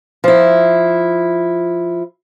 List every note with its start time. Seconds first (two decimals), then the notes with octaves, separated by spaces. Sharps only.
0.24 F3 E4